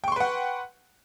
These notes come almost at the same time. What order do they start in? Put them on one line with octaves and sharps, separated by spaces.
G5 C#6 C6 B4 F#5